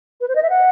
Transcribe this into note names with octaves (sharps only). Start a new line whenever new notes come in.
B4
C5
D#5
E5
F#5